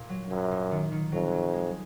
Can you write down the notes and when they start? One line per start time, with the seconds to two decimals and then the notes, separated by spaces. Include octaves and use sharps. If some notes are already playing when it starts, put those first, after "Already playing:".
Already playing: A#2
0.09 F#3
0.30 F#2 A#2
0.51 A#2
0.71 D#3
0.92 D#3
1.12 F2 F#3
1.32 F#3
1.54 G#3